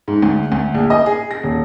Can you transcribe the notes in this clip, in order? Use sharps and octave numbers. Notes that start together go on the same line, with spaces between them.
G#2
D2
D2
A#1
D#5
G#4
A#6
D#1